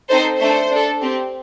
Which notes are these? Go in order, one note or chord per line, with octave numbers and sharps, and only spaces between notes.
C4 D#4 A4 C5
A3 D4 A4 C5
D4 A4
C4 G4